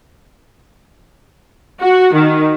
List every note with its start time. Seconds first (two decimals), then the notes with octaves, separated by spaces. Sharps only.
1.82 F#4
2.13 D#3